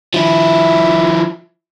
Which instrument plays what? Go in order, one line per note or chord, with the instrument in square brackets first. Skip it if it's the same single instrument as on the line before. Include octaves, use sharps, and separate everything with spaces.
[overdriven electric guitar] F3 E4